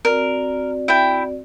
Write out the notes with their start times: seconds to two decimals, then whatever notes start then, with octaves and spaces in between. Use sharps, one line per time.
0.05 C4 F#4 A#4 D5
0.88 E4 G5